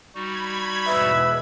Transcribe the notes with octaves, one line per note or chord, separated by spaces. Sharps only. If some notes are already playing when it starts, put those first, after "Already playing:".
G3 D#4 F#4 B5 G#6
E2 G#2 B2 B4 E5